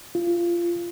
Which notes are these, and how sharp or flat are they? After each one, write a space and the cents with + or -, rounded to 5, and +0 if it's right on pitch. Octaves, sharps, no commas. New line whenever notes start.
F4 -20